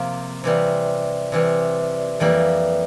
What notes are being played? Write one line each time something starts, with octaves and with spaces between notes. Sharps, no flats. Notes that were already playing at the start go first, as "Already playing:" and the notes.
Already playing: C3 F3 A#3 F4
C3 E3 G3
C3 E3 G3
F2 E3 G3 A#3